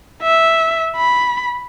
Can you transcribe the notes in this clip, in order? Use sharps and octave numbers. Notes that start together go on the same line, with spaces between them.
E5
B5